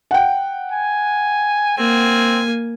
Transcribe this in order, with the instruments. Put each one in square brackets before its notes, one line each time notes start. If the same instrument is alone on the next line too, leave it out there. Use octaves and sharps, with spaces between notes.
[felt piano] F#5 G5
[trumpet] G#5
[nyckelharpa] A#3 G#5 [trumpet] C4